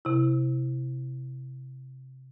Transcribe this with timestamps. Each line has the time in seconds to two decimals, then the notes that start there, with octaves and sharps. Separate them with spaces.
0.05 C3 E4